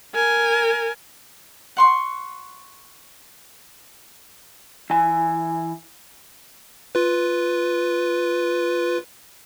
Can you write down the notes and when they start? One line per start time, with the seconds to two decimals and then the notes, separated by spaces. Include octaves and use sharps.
0.14 A#4 G#5
1.77 F#5 C6 C#6
4.90 E3 G#5
6.95 F4 B4